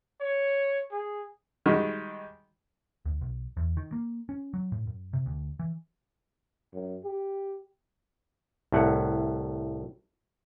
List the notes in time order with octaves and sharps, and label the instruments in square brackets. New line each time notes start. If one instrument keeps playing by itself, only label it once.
[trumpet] C#5
G#4
[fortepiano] D#3 G3 G#3 F#4
[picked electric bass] D2
B1
E2
D#3
A#3
C#4
F#3
A2
F#2
C3
D2
E3
[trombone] F#2
G4
[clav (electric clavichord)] C2 A2 F#5